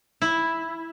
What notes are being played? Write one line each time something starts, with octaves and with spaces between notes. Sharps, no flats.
E4